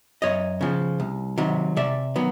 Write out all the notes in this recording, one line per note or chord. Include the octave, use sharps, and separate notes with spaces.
F#2 C#5 D#5
C#3 F3
C2
C3 D#3 F#3
C3 D5 E5
D#3 F#3 B3